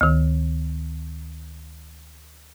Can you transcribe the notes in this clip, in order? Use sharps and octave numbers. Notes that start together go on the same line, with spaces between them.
D2 D#3